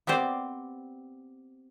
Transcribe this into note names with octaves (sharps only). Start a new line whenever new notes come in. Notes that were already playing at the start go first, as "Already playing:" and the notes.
B3 C4 G4 C5 D5